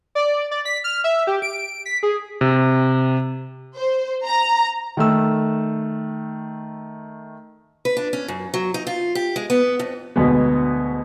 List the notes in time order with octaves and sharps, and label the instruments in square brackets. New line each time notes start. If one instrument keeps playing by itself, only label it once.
[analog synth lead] D5
D5
B6
F6
E5
G4
D7
B6
G#4
[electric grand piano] C3
[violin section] C5
A#5
[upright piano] D#3 A3 E6
[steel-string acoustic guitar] B4
D4
C#4
F#2
F#3
D#4
F4
G4
G#3
B3
F2
[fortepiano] D2 B2 G#3 B3